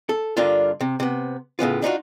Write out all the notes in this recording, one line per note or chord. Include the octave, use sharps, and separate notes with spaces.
A4
G2 D3 A#3 D4 F4
C3
C3 B3
A2 C#3 B3 F4
D4 D#4 F4 F#4